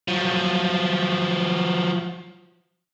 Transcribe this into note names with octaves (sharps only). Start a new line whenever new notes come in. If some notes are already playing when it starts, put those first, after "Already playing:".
F3 F#3